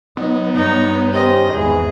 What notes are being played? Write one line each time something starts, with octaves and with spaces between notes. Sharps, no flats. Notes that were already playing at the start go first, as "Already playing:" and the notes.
F#3 B3 D#4
G2 D#4 C#5
D#3 C#4 G4 C5 D#5
G#1 E2 G#2 E3 G#4